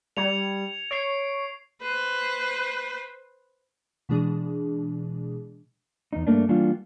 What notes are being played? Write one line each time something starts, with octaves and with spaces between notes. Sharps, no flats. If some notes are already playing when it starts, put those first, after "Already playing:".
G3 G#6 C#7 F7
C#5 C7 D7
B4 C5
B2 E3 G#3 D4 G#4
E2 D#4
G2 A3 A#3 D4
E3 G3 A#3 D4 F4 F#4